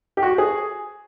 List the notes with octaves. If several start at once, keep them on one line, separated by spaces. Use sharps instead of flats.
G4
F#4
G#4